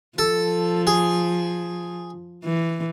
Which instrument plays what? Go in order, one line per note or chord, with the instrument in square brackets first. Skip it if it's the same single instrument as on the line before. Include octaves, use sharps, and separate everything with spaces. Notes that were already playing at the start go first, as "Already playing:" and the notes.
[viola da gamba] F3 [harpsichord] A4
[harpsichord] G#4
[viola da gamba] E3